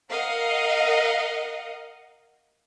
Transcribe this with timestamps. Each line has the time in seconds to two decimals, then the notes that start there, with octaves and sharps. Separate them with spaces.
0.11 A#4 D#5 F5 F#5